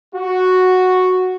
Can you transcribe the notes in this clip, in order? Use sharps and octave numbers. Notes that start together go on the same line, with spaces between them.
F#4